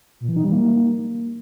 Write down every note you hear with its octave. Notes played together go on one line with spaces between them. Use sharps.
A#2
E3
D#4
G3
A#3